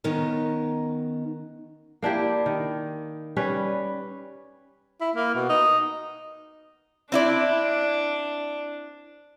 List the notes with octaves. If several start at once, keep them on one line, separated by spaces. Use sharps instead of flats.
D#3 B3 C#4 D#4 A#4
A#3 D4 E4 G4
D#3
G3 C#4 B4
E4
A#3
B2
D#4
C4 D4 E4 D5